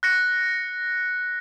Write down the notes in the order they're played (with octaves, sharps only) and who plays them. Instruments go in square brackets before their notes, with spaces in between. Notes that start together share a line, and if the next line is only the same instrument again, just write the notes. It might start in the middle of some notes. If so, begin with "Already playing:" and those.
[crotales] F#6 A#6 C#7